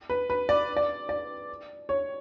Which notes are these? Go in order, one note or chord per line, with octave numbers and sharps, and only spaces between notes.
B4
B4
D5
D5
D5
C#5